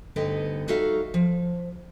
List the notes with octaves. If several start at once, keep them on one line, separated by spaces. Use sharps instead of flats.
D2 G2 D3 B3 D#4 D#5
G3 D#4 F#4 A4 E5 F5
F3